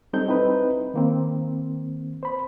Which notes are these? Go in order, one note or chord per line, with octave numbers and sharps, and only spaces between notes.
G3 C4 D#4 A4 G6
C4 D#4 E4 B4
D#3 A#3 C4
C5 B5